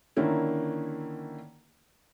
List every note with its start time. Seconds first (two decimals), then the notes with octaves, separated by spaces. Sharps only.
0.16 D3 D#3 A#3 C#4 E4